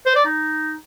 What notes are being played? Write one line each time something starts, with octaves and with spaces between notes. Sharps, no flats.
C5
D5
D#4